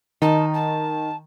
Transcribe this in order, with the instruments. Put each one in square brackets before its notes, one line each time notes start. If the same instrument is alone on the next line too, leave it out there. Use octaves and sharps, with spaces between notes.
[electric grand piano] D#3 [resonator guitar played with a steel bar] D#4 [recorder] A5
[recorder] A5